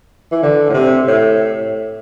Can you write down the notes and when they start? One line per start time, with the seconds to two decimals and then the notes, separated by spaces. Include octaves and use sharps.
0.32 E3
0.43 D3
0.70 A2
0.74 C3
1.08 A2